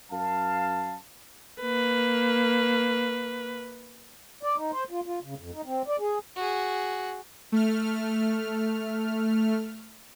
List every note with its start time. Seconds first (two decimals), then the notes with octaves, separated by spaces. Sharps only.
0.11 F#2 F5 A5
1.61 A#3 B4
4.43 D5
4.56 D#4
4.72 C5
4.91 F4
5.06 F4
5.23 C#3
5.38 F2
5.54 D#4
5.66 C4
5.88 D5
5.99 G#4
6.36 F#4 G#4
7.52 A3 F6